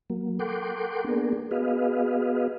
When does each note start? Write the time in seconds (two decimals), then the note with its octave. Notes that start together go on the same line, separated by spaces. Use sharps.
0.10 F#3 A#3
0.39 A4 A#4 F#5 G5 C6 D6
1.04 A#3 B3 D4 G#4 A#4
1.51 B3 F#4 G#4 B4 D#5 F5